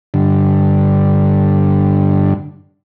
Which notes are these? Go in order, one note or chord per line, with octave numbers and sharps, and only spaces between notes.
G2 D3